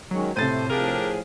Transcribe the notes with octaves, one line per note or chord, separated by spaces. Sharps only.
D#3 F#3 G#3 C#4
A2 C3 F3 A4 C5 A6 D#7
A2 F3 D4 G4 G#4 A#4 F5